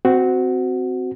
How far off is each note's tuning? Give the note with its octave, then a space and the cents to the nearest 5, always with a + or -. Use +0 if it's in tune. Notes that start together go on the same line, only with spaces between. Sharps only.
C4 -15 F#4 +0